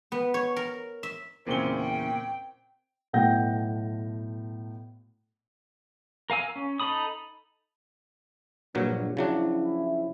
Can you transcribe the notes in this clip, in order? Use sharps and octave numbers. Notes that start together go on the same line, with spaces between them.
B3
C#5
A#4
E5
E2 A#2 C#3 C4 C#4 G7
G5
B1 A2 F#5 G5 G6 A#6
A#4 F5 G#5 E6
C#4
D#4 A4 B5 D#6
A#1 G2 A#2 F#3
C#3 F3 F#3 C#4 D4 E4